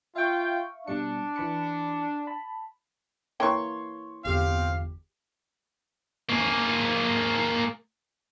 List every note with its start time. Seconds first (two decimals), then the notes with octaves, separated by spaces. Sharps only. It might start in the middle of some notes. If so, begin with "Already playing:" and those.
0.16 F4 E5 F5 G5 C#6
0.88 B2 G3 D4 C#7
1.36 E3 B5 C#7
2.27 A5 B5
3.40 E3 A#3 C#5 G5 C6 C#6
4.25 G1 E2 C4 G4 F5
6.29 A#3 G#4